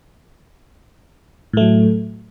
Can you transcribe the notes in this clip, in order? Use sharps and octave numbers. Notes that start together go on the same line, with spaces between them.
A2 F#3 A3